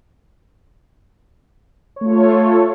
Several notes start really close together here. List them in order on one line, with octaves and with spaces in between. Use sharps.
C#5 A3 F4 A4